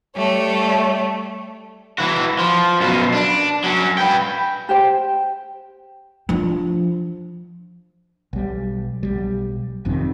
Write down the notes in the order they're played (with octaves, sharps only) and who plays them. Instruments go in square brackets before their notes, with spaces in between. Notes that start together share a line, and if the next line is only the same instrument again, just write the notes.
[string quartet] G3 A3 C#5
[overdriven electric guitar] E3 F#4
F3
F#2 B2
D4
F#3 C#4
B4 G5
[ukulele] G4 C5 G5
[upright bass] F3 D4
[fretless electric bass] B1 G3
B1 G3
G#1 F2 C3 D#3